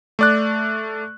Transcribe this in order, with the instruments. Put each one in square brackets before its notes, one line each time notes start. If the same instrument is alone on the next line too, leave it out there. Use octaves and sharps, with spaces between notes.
[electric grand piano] A3 D5 F#6